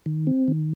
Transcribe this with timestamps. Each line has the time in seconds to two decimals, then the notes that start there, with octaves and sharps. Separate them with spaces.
0.06 D#3
0.27 C4
0.48 D#3